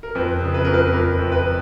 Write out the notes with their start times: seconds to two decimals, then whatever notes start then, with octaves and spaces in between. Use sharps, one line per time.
0.03 A#4
0.15 F2 B4
0.41 C#3
0.54 B4
0.65 F2 A#4
0.74 B4
0.92 F2 A#4
1.19 F2
1.32 B4